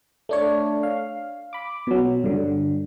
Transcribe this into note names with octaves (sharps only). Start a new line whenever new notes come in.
A3 D4 C#5
F5
B5 D6
B2 F#3
G2 D3